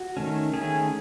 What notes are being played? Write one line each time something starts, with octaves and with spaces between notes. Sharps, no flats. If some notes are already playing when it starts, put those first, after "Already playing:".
Already playing: F#4
D#3 A3 C#4
D#3 A3 C#4 G#4